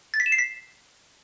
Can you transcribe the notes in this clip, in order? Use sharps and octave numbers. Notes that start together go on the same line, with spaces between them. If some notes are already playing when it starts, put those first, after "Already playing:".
A6
B6
E7
C7
B6